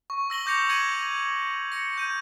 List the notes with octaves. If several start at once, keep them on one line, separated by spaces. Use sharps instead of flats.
C#6
E6 A#6 F#7 G7
D6 G6 A#6 C#7 F7
G#6 A#6 C#7 D#7 F#7
A#6 C#7
G6 D#7